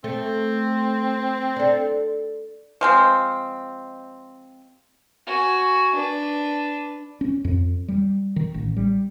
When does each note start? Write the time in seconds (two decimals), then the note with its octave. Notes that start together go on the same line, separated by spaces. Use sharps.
0.04 A3 C4
1.56 D4 A4
2.81 F3 G#3 C4
5.27 F#4 G#5
5.95 D4 B4
7.21 C#4
7.45 F2
7.88 G3
8.36 D#3
8.54 A1
8.77 G3